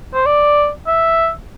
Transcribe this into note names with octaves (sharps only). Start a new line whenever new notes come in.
C5
D5
E5